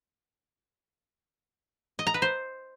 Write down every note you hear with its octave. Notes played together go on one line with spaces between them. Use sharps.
D#5
A#5
B4
C5